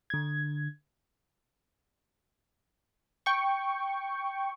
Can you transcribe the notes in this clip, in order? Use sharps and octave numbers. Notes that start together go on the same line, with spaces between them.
D3 G#6
G5 C#6